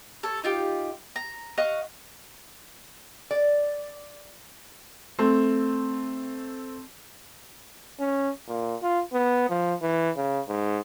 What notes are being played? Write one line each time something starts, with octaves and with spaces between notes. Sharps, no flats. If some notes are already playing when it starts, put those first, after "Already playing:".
A4 C#5
D#4 F4 G4
A#5
D#5 F5 F#5 C#6
D5
A3 C4
C#4
A#2
F4
B3
F3
E3
C#3
G#2